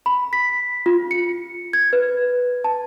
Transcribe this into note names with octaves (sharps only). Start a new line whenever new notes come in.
B5
B6
F4
C#7
G#6
B4
A5